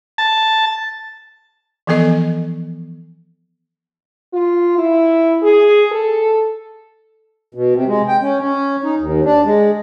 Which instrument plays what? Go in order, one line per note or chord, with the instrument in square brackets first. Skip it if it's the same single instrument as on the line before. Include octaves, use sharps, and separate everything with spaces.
[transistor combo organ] A5
[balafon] E3 F3 B3 A4 D#5 G#5
[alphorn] F4
E4
G#4
A4
[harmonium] B2
C3
G#3
G5
C#4
C#4
D#4
D#2
D4
G#3